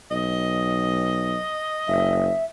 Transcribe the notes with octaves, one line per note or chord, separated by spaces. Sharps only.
B1 D#5
F#1 E5